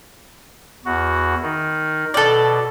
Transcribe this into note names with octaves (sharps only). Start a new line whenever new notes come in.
E2 F#4
D#3 D#4
B2 A4 D5